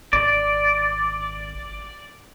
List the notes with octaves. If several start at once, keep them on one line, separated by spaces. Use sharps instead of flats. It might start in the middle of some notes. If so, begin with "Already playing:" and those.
G#1 D5